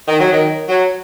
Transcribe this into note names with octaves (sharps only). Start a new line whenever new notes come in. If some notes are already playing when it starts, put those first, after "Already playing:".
D#3
F#3
D#3
F#3